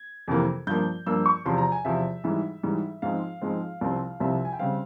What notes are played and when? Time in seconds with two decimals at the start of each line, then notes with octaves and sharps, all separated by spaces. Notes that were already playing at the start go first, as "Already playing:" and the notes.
Already playing: G#6
0.28 F2 C3 E3 A#3
0.67 G2 F3 A#3 G6
1.06 G2 F3 A#3 E6
1.26 C#6
1.45 E2 C3 F3 C6
1.58 A#5
1.72 G#5
1.85 E2 C3 F3 E5
2.24 G#2 E3 G3 E5
2.63 G#2 E3 G3
3.02 G#2 F3 G#3 C4 F5
3.41 G#2 F3 G#3 C4
3.81 C2 C3 F3 C4
4.20 C2 C3 F3 C4 E5
4.45 G#5
4.53 G5
4.59 C#3 G3 C4 F5